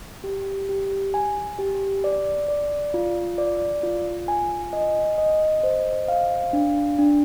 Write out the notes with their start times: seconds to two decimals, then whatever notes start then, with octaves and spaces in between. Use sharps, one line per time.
0.24 G4
0.69 G4
1.14 G#5
1.59 G4
2.04 D5
2.48 D5
2.94 F4
3.38 D5
3.83 F4
4.28 G#5
4.73 D#5
5.18 D#5
5.63 C5
6.08 F5
6.53 D4
6.99 D4